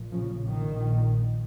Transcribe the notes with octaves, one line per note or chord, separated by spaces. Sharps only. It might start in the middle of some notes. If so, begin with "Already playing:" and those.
Already playing: A#1 A#2
C#3 F3
A#1 A#2 D#3